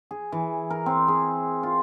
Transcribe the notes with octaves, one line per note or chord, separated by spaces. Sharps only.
G#4
E3
A#4
C4
G#4
F4